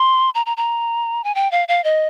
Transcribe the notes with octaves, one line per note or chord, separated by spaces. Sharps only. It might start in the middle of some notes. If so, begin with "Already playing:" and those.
Already playing: C6
A#5
A#5
A#5
G#5
G5
F5
F5
D#5